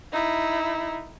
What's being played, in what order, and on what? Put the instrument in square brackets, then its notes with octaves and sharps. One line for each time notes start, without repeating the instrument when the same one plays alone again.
[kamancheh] D#4 E4